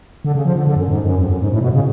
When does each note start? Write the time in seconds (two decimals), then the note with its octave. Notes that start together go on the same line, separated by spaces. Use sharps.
0.25 D3
0.35 C#3
0.45 F3
0.56 D3
0.67 D3
0.76 F#2
0.88 G#2
1.04 F#2
1.19 F2
1.30 F#2
1.41 G#2
1.52 A2
1.61 B2
1.73 C#3